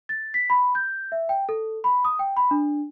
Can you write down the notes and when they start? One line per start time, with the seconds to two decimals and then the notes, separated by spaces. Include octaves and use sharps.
0.09 A6
0.34 B6
0.50 B5
0.75 G6
1.12 E5
1.29 G5
1.49 A4
1.84 B5
2.05 D#6
2.19 G5
2.37 B5
2.51 D4